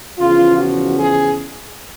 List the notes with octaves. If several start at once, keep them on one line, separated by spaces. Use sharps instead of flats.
E2 C#3 F3 F4
F#4
G#4